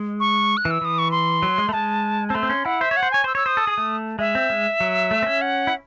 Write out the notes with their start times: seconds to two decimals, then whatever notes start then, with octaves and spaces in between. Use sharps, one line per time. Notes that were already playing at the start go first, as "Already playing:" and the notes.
Already playing: G#3
0.20 C#6
0.57 F#6
0.65 E3
0.71 E6
0.82 E3 D#6
0.99 C#6
1.11 C6
1.43 F#3
1.58 G#3
1.69 A3
1.73 G#3 A5
2.28 C4 A5
2.35 A3 C6
2.43 C4
2.50 C#4
2.65 E4 F#5
2.81 C5 E5
2.91 C#5
2.97 F#5
3.03 C5
3.11 C#5 G#5
3.24 C5 E6
3.35 C#5 E6
3.46 C5 D#6
3.57 A4
3.67 G#4
3.78 A3
4.19 G#3 E5
4.35 C4
4.50 G#3
4.80 F#3
5.11 A3
5.23 C4
5.26 C#4
5.42 F#5
5.67 E4